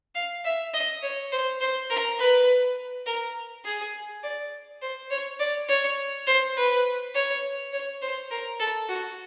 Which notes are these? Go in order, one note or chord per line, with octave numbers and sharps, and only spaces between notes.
F5
E5
D#5
C#5
C5
C5
A#4
B4
A#4
G#4
D5
C5
C#5
D5
C#5
C5
B4
C#5
C#5
C5
A#4
A4
F#4